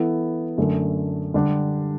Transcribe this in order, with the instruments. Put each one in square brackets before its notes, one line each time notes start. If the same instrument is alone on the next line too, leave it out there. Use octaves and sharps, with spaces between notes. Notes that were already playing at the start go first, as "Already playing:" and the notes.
Already playing: [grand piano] E3 B3 E4 A4
F#2 D3 A3
D3 G3 D4 G4